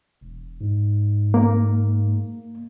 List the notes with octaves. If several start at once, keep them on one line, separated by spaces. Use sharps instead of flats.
E1
G#2
A#3